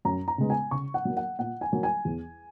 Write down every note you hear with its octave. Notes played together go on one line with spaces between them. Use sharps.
F#2 A#5
A#5
C#3 G#3 B3
G#5
C#3 C#6
F#5
F#3 A#3
F#5
A#2 F#5
G#5
F#3 A#3
G#5
E2